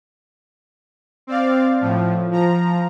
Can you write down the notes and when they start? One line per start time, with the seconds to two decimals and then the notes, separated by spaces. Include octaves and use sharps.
1.27 C4 D5 F5
1.81 A2 F3
2.31 F3 A#5